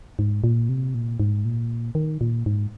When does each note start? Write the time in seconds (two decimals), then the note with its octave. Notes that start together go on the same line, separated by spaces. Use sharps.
0.19 G#2
0.44 A#2
0.69 C3
0.95 A#2
1.20 G#2
1.45 A#2
1.95 D#3
2.21 A#2
2.46 G#2